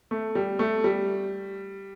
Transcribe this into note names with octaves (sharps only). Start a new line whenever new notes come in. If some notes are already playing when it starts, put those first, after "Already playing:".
A3
G3
A3
G3